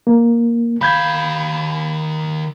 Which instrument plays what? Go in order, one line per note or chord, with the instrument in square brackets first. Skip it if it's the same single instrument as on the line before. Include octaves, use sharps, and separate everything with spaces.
[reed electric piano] A#3
[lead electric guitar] D#3 F5 [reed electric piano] B5 G6 G#6